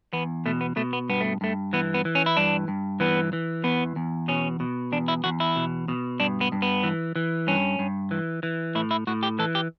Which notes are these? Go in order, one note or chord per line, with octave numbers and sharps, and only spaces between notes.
E2 B3
B2 A3
B3
B2 A3
B3
G2 B3
A3
G2 A3
E3 B3
B3
E3
C#4
E4
G2 D4
G2
E3 B3
E3
E2 B3
E2
B2 C#4
B2
E2 D4
E4
E2 F#4
E4
B2
B2
G2 D4
B3
G2
B3
E3
E3
G2 C#4
G2
E3
E3
A2 E4
E4
A2 F#4
G4
E3 A4
G4